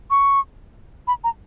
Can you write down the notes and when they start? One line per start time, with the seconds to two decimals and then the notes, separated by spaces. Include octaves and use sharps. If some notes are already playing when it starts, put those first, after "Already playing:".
0.10 C#6
1.07 B5
1.24 A#5